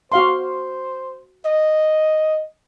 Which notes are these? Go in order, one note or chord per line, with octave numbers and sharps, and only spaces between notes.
F#4 C5 F5 C6
D#5